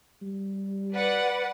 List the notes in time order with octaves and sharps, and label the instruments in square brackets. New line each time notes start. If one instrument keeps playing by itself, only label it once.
[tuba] G3
[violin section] B4 D5 F#5